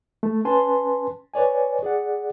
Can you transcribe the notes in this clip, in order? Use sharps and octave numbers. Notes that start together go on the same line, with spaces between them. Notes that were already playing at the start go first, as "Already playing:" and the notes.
A3
C#4 B4 G#5 A5 C6
B4 C#5 D5 G#5
G#4 D5 F#5